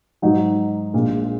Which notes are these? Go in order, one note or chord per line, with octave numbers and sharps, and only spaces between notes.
G#2 F#3 D#4 F#4
A#1 A#2 G#3